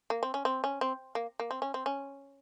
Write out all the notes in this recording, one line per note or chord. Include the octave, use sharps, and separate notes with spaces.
A#3
C4
C#4
C4
C#4
C4
A#3
A#3
C4
C#4
C4
C#4